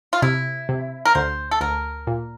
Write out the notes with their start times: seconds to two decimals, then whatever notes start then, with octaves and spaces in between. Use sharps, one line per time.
0.13 F4
0.22 C3 E4
0.69 C3
1.05 A#4
1.15 D2 C5
1.51 A4
1.61 D2 A#4
2.07 A#2